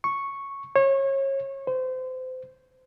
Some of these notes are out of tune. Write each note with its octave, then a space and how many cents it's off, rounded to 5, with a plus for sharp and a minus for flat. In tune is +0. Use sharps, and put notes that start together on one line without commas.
C#6 -5
C#5 -30
C5 -30